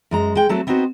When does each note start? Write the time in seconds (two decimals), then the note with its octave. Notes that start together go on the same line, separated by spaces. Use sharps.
0.11 F#2 G#3 A#5
0.35 G#3 G5
0.49 F#3 A3 C4 F#4 A4
0.67 B3 C4 D#4 F#4 C5